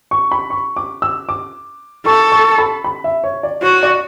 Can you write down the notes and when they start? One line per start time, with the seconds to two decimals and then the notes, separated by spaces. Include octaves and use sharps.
0.11 C#6
0.32 B5
0.50 C#6
0.77 D6
1.02 E6
1.29 D6
2.06 A4 C#6
2.32 C#6
2.58 B5
2.84 B5
3.04 E5
3.24 C#5
3.43 D5
3.63 F#4 C#5
3.83 D5